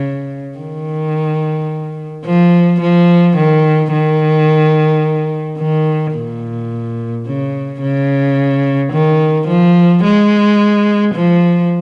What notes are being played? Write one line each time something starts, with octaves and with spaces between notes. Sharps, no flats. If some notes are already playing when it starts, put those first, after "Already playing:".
Already playing: C#3
D#3
F3
F3
D#3
D#3
D#3
A#2
C#3
C#3
D#3
F3
G#3
F3